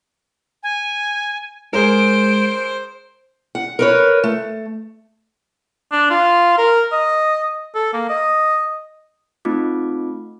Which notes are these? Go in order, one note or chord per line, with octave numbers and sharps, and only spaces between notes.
G#5
G#3 G#4 A#4 C5 D7
F#5
A#4 B4 C#5
A3
D4
F4
A#4
D#5
A4
A#3
D#5
A3 C4 D#4 F4 D6